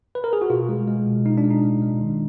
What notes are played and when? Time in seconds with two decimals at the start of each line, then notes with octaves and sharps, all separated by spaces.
0.15 B4
0.24 A#4
0.33 G#4
0.42 F#4
0.50 B2 F4
0.69 G#3
0.87 G#3
1.07 B2
1.25 G#3 D#4
1.38 D4
1.44 G#3
1.50 D#4
1.63 G#3
1.82 G#3
2.01 D#3